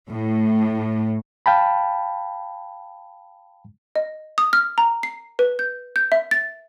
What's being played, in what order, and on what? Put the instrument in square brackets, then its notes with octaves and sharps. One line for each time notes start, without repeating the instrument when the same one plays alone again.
[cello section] A2
[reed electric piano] F5 G5 A5 B5
[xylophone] D#5
D#6
F6
A#5
C7
B4
G6
G6
E5
A6